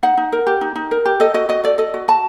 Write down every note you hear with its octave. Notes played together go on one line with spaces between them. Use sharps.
D#4 F#5
D#4
A#4
G4
D#4
D#4
A#4
G4
A4 D#5
F#4 D#5
F#4 D#5
A4 D5
A4 D#5
F#4
F#4 A5